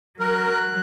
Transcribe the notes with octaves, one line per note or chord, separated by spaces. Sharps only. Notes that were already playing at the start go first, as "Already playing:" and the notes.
F#3 A#4 F#6